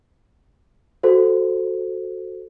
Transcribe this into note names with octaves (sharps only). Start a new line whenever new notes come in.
F#4 A4 C5